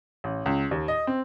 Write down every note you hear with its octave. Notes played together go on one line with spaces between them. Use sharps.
A1
C#2
D#2
D#5
C4